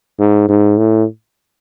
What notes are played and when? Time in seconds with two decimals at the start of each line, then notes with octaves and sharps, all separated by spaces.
0.19 G#2
0.49 G#2
0.78 A2